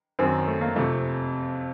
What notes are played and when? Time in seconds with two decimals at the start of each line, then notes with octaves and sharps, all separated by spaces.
0.19 F#2 D#3 F#3 C4
0.47 A3
0.61 A#3
0.76 F2 C3 F3 A3